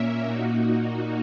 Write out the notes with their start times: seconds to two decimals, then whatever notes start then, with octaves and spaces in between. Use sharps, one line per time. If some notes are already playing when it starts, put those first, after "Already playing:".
Already playing: A#2 A#3 C#4 A#4 E5
0.25 A#2 A#3 D#4 F#4